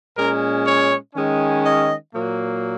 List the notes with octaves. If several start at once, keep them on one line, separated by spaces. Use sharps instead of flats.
A#2 G#3 C#4 A#4
C#5
D#3 G#3 C#4
D#5
A#2 F#3 A#3